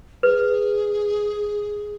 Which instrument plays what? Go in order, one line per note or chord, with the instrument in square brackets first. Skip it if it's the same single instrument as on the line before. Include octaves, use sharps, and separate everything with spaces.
[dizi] G#4 [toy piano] B4